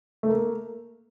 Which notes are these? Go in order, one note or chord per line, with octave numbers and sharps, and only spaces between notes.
A3
A#3